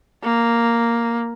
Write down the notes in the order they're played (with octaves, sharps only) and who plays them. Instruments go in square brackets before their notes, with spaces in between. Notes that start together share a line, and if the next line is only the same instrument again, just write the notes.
[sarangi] A#3